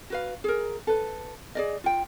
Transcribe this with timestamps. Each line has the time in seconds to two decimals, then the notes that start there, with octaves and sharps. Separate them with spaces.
0.10 F#4 B4 F5
0.44 G#4 A#4
0.87 A4 B4
1.55 G#4 D5 D#5
1.84 F4 G5